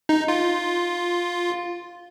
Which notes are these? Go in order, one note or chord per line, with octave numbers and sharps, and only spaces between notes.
D#4
F4